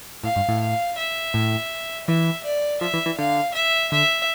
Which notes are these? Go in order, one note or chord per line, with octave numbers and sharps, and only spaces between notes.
A2 F5
G2
A2
F5
E5
A2
E3 E5
D5
F3 E5
E3
E3
D3 F5
E5
D3 E5